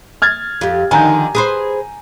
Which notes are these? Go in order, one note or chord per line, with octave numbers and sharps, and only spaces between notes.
F6 G#6 A6
F2 G4
D3 D#3 F3 G#5 A#5 G6
G#4 B4 C5